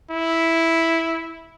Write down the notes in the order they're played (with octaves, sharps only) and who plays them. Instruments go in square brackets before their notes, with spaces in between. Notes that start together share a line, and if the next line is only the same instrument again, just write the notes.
[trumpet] E4